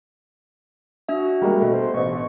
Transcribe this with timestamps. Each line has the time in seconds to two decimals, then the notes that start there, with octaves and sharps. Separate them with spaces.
1.09 D4 F#4 E5
1.42 G3 G#3 A#3
1.60 B2 A3
1.73 C5
1.94 A1 B2 C#6